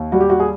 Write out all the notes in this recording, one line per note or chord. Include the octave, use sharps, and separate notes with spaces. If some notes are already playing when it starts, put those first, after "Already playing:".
Already playing: D#2
G3 F#4
G4
F#4
G#4